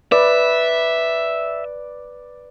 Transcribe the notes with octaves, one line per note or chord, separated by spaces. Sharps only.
B4 D5 E5